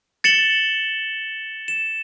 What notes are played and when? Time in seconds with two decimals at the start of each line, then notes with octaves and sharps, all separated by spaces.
0.24 A6 C#7 E7 F#7 G7
1.68 E7